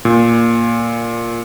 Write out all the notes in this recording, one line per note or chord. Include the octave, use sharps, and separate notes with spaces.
A#2